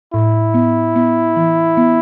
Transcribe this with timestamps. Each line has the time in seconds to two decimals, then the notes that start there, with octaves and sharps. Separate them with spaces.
0.13 A2 E4
0.54 B3
0.95 B3
1.36 E3
1.77 B3